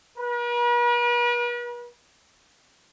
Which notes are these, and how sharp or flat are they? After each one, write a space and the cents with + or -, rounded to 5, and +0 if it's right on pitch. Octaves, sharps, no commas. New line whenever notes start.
B4 -45